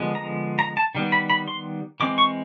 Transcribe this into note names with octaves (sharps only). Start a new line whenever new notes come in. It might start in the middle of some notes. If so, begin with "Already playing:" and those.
Already playing: D3 F3 G#3 B3
A#5
A#5
A5
D#3 G3 B3
B5
B5
C6
E3 G#3 C4 D6
C#6